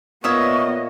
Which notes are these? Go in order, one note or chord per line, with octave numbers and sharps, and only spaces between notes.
A#2 B3 C#5 D#5 E5 C#6 D#6